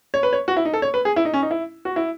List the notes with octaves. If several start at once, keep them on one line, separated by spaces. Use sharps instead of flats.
C#5
B4
C#5
F#4
E4
D#4
A4
C#5
B4
G#4
E4
D#4
C#4
D#4
E4
F#4
E4